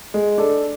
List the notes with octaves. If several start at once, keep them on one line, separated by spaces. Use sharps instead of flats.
G#3
D4 A4